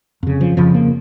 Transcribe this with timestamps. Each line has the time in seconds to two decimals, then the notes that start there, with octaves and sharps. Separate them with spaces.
0.23 F2 C#3
0.41 F3
0.57 F2 C#3 F3
0.74 A#3